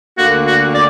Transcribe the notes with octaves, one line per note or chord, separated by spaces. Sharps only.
D2 D3 A#3 F#4
F#4
D5